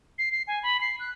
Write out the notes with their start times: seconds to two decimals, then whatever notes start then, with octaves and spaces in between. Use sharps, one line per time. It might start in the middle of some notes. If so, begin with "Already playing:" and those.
0.18 C7
0.32 C7
0.47 G#5
0.63 B5
0.81 C7
0.99 F#6